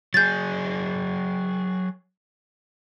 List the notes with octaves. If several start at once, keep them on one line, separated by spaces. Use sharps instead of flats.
F#3 G#4 G6 A6